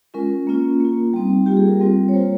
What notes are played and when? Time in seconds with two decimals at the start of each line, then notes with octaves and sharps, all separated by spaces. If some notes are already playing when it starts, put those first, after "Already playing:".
0.14 G#3 C#4 F4 A#4
0.47 A#3 C#4 F4
0.80 A#3 F4
1.13 G3 C4 D#4
1.46 G3 A#3 F4 G4
1.57 G#4
1.68 A#4
1.80 G3 C4 F4
2.09 C#5
2.13 G3 A#3 F4 C5